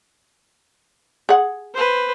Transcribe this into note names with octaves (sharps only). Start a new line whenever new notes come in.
G#4 F#5
B4 C5